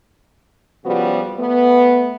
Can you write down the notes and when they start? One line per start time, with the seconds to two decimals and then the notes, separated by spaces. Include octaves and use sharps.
0.85 C#3 F3 G3 B3 F#4
1.38 A3 B3